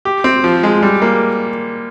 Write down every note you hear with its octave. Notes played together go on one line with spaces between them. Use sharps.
G4
C4
F3
G#3
G3
A#3